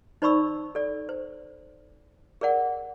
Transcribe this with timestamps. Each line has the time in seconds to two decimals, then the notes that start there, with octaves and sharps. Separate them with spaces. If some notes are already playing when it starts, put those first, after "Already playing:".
0.22 D#4 C5 D5 B5 C#6 E6
0.75 A4 D5
1.09 C5
2.41 G#4 A#4 D5 F#5